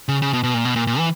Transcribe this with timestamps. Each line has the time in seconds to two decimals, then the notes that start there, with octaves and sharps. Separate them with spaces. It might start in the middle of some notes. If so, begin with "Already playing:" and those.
0.08 C#3
0.22 C#3
0.33 B2
0.43 B2
0.54 A#2
0.65 B2
0.76 A#2
0.87 A#2
0.98 E3